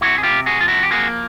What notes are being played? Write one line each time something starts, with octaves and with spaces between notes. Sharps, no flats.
C3 E4 F#4
G#4
F4 G4
C3
F#4 G#4
F3 F4
E4 F#4
G4
A#3 F#4 G#4